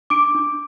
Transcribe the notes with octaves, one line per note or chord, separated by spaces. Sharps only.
D4 D6 D7
D4